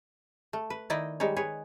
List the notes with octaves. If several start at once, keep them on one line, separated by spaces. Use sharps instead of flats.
A3
B4
D#3 D#4 E4 D5 D#5
G3 G#3 D#4 C#5
G#4 B4 C#5